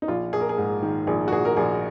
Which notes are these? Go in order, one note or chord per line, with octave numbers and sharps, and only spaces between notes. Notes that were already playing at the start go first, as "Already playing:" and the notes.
D#4
A#1 F4
A#1 G#4
A#4
G#4
G#2
D#3
A#1 G#4
F#4
A#1 G#4
A#4
A#1 G#4